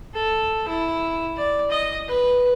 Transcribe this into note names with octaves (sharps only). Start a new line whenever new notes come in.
A4
E4
D5
D#5
B4